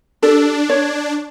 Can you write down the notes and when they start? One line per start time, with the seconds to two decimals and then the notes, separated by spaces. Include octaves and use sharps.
0.22 D4 G4 A4
0.69 C#5